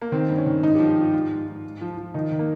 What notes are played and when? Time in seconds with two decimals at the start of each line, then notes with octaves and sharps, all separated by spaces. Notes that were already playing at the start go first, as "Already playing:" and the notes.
0.01 A#3
0.12 D#3 C4
0.29 G2
0.38 C#4
0.46 D#3
0.63 G#2 D#4
0.75 G4
0.79 F3
0.89 G4
0.97 G#2 F4
1.13 G#2 F4
1.30 G#2
1.47 G#2
1.64 G#2
1.81 F3
1.98 F3
2.14 D#3 D#4
2.32 D#3
2.39 A#3